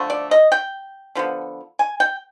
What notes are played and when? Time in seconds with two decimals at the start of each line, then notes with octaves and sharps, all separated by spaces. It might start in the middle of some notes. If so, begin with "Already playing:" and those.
Already playing: D3 F3 A3
0.10 D5
0.31 D#5
0.52 G5
1.15 D3 F3 G#3 B3
1.79 G#5
2.00 G5